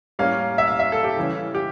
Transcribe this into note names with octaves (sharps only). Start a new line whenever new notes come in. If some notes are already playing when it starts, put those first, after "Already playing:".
A2 G3 A#3 C#4 F5
E5
F5
E5
A4
G4
C#3 E3 G3 C#4
G4